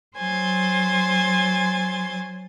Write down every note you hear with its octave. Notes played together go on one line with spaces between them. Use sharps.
F#3 C5 G#5 C6 A6